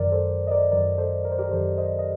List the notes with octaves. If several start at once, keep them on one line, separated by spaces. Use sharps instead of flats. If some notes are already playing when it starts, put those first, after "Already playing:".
Already playing: F#2 D#3 F#3 A#4 D5
A4 C5
D#5
A#4 D5
F#2 D#3 F#3 A#4 D5
A4 C5
A#4
C5
G4 A#4
F#2 D#3 F#3 A4 C5
C5 D#5
D#5